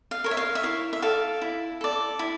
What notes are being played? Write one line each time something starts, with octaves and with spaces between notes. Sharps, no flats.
F5
A#4 C#5
E5
F5
E5
E4 F5
E5
A4 D5 F5
E4
A4 D5
E4